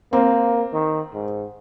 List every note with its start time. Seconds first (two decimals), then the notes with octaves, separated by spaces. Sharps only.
0.13 A#3 C4
0.73 D#3
1.14 G#2